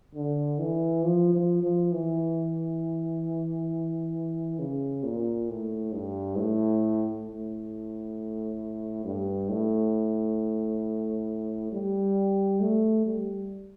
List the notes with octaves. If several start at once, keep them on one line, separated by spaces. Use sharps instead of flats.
D3
E3
F3
F3
F3
E3
C#3
A#2
A2
G2
A2
A2
G2
A2
G3
A3
G3